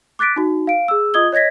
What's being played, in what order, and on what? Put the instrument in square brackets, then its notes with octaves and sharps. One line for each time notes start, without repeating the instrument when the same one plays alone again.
[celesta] D6 F#6 A6 B6 D7
D#4 F#4
F5 D7
G#4 E6
F4 D#5 D#6 G#6 G7
C#5 D#5 G#6 A#6 B6